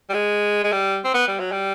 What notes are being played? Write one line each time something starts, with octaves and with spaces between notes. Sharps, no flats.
G3
G#3
G#3
G3
C4
B3
G3
F#3
G3